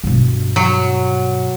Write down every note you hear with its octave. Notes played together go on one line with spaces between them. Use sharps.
G2 B2
F#3